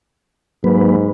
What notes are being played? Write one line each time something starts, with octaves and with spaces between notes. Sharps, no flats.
G#2 F#3 A#3 B4